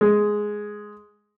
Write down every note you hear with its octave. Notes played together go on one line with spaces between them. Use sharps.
G#3